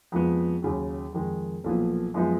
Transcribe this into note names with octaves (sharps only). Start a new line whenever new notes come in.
F2 F3 G#3 B3
D#2 C#3 F#3
F2 D#3 G#3
B1 A#2 F3 B3
F#2 F3 G#3 B3 D#4